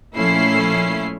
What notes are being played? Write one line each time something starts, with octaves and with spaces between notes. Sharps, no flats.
A#2 F3 A3 C#4 E4 C7